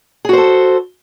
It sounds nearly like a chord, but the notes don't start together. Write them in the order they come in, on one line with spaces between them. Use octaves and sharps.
G#4 F#4 C5 A4